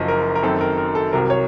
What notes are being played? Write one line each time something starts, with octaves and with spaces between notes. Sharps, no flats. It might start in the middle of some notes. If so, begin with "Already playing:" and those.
Already playing: F#1 F#2 F3 D#5
A#4
A#4
F#2 D#3 F#3 C4 A4
A#4
A#4
A4
C2 C3 F#3 A#4
C#5